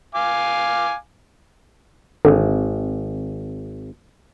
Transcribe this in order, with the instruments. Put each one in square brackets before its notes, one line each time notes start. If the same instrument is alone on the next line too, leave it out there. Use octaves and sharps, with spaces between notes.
[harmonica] F5 G#5 D6
[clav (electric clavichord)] G#1 [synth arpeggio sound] D3